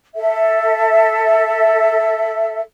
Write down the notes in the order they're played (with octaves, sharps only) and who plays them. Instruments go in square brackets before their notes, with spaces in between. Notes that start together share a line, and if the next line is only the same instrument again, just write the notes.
[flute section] A4 E5